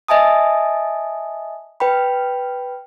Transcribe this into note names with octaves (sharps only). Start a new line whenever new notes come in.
D#5 E5 G#5 A5 D#6
B4 G5 B5